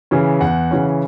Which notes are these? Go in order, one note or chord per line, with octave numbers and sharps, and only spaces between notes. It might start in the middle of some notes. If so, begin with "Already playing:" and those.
C#3 E3 C#4
E2 F#5
C#3 E3 C#4